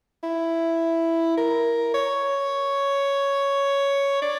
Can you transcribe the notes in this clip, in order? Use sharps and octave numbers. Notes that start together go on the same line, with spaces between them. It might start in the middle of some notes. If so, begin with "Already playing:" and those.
E4
A#4
C#5
D5